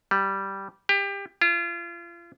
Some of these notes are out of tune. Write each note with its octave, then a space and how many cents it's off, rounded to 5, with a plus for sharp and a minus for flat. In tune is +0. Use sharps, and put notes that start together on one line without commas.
G3 -10
G4 +25
F4 -35